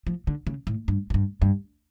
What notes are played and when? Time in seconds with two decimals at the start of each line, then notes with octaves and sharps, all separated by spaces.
0.07 F3
0.27 D3
0.47 C#3
0.67 A2
0.88 G2
1.10 A2
1.14 G2
1.42 G2